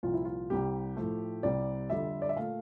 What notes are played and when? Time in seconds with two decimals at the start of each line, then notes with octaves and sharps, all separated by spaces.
0.03 C2 A#2 F3 F4
0.14 E4
0.25 F4
0.50 C2 C3 G3 G4
0.96 A2 F3 A3
1.43 C2 C3 G3 D5
1.90 F2 D3 G3 E5
2.22 D5
2.29 E5
2.36 A#2 A3 F5